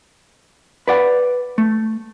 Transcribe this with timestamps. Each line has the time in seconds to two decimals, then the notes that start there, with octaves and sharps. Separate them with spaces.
0.88 B4 D5 F#5
1.58 A3